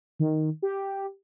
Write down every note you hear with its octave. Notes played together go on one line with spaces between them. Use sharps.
D#3
G4